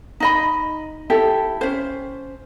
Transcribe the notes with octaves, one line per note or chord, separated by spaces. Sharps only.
D#4 D#5 B5
E4 G4 A4
C#4 C5